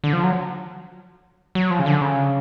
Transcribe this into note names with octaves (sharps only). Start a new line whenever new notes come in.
D3
F3
F#3
F#3
F3
C#3
D3
C#3